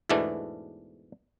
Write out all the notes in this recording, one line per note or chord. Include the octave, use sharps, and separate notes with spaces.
E2 G#2 B2 E3 A3 D4